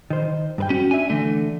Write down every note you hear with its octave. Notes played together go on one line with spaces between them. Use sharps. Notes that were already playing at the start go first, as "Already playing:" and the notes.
D#3 C5
G2 B4 G5
C#4 F#4
D4 E5 G#5
D3 E3 A3